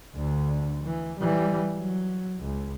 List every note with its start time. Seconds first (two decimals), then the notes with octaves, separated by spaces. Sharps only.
0.15 D2 D3
0.84 E3
1.20 E3 G3
1.78 F#3
2.43 C#2